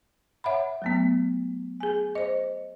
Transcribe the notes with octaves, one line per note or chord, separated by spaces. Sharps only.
C#5 E5 F#5 B5
F#3 A3 B3
G#4 G#5
C5 D#5